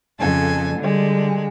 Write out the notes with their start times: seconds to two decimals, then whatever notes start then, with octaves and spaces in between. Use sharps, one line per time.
0.19 F2 C#3 A4 G#5
0.79 D3 G3 G#3